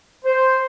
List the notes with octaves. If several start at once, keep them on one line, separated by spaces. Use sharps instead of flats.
C5